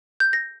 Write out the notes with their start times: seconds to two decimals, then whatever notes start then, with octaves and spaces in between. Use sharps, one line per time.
0.20 G6
0.33 A#6